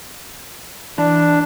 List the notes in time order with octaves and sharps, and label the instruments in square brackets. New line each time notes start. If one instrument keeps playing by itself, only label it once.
[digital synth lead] E3 [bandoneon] D4